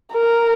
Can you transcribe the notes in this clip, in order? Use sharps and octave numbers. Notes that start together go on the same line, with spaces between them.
A#4